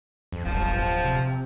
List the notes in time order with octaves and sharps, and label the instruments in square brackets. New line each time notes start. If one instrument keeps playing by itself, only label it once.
[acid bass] F2
[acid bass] D1 [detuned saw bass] G1 [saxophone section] F3
[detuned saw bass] C3